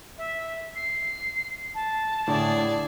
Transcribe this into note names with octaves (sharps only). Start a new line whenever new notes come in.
E5
C7
A5
A2 D3 G#4 D5